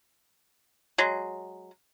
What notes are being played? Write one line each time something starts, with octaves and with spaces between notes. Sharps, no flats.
F#3 G#3